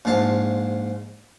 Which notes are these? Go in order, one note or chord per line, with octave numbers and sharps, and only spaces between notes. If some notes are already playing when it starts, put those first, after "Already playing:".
A#1 G#2 F4 A5